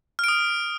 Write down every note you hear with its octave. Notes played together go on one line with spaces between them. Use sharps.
D#6 F6 D7